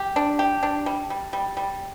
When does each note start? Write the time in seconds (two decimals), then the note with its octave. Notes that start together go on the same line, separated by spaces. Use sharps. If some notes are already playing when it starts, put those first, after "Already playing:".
Already playing: G4
0.16 D4
0.39 G4
0.63 D4
0.86 G3
1.10 G3
1.33 G3
1.57 G3